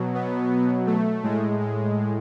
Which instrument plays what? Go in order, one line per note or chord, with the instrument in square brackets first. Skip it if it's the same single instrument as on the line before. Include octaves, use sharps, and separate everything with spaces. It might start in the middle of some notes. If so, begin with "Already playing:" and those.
Already playing: [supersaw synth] B2 F#3
B3
A3
A2 G#3
G#3